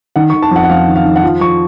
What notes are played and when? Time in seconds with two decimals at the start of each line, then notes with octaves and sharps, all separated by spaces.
0.16 D#3 F#5
0.30 C#6
0.34 D#3
0.43 A5
0.51 F2 F#5
0.64 F#5
0.70 F2 F5
0.88 D#3
0.96 F5
1.05 D#3
1.16 F#5
1.23 F3 F5
1.41 F3 C#6